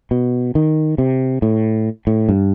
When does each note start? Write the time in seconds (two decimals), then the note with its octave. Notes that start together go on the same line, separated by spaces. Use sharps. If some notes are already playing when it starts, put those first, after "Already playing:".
0.11 B2
0.55 D#3
0.98 C3
1.42 A2
2.07 A2
2.29 G2